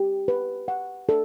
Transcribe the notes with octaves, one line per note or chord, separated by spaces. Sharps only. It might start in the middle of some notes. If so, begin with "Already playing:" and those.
Already playing: G4
B4
F#5
A4